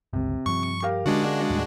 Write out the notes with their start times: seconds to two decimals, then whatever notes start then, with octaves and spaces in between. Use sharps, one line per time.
0.13 G1 C#2 C3
0.46 G2 F3 C#6
0.82 G4 A#4 F5
1.06 D3 G#3 C#4 D4 F#4
1.50 D#2 A2 G3